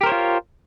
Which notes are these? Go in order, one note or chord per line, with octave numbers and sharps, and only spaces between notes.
F4 G4 A#4 C5 C#5